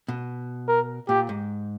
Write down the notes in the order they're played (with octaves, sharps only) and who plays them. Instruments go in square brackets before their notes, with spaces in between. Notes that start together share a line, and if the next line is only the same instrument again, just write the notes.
[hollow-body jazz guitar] B2
[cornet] A#4
[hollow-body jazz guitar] A#2 [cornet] G4
[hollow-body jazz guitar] G#2